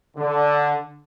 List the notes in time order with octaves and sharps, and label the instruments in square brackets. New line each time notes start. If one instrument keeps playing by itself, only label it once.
[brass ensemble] D3